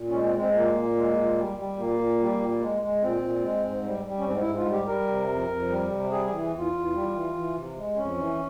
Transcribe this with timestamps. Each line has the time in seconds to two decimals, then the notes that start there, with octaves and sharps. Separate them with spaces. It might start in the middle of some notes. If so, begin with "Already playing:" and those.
Already playing: A#2
0.08 G#3 C#4
0.24 C4
0.34 G#3
0.39 C4
0.54 A#2 A#3
0.75 A#2
0.96 G#3
1.15 A#2
1.36 G3
1.57 G3
1.77 A#2 A#3
1.99 A#2
2.20 G3
2.40 A#2
2.60 G#3
2.81 G#3
3.02 A#2 C4
3.22 A#2
3.42 G#3
3.64 G#2
3.83 G3
4.04 G3
4.18 C#4
4.25 G#2 C4
4.40 E4
4.46 G#2
4.57 F4
4.66 G3
4.72 G4
4.86 G3 A#4
5.08 C3
5.29 F2
5.50 F2
5.69 G3
5.90 C3
6.10 G3 G#4
6.27 E3 G#4
6.52 E2
6.58 F4
6.73 E2
6.93 G3
7.14 E3
7.34 E3
7.56 C3
7.76 G#3
7.96 F2 C#4
8.18 E3